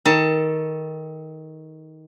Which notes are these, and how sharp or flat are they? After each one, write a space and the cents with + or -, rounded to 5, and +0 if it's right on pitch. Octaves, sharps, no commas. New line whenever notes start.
D#3 +20 A4 +0 A5 +20